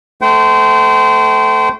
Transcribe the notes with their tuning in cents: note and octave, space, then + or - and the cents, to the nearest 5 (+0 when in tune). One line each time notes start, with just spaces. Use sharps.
A3 +0 C5 -25 G5 -40